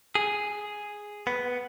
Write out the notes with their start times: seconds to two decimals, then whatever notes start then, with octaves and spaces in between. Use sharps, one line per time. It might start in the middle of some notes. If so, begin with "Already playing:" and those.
0.15 G#4
1.27 B3